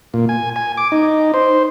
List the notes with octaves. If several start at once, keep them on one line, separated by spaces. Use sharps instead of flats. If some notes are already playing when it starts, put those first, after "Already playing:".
A#2
G#5
G#5
D6
D#4
C5